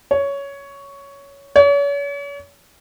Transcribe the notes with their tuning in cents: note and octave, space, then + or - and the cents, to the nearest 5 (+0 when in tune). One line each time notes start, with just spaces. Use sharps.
C#5 +10
C#5 +40